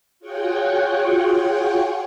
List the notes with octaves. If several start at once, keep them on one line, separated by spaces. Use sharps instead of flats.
F4 F#4 G#4 C#5 F#5 G5